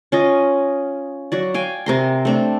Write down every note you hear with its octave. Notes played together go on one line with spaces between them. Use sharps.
C#4 F4 D#5
F#3 F#4 D5
F5 G5 G#5
C3 A#4 C6
A3 C4 D4